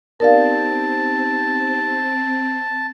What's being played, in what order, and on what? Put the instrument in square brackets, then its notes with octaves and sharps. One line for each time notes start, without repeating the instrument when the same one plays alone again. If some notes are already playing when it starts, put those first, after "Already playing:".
[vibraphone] B3 D#4 G4 [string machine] C4 [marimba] A#4 D5 F5 [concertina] A5